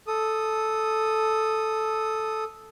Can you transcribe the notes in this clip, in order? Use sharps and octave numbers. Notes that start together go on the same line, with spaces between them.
A4 D#6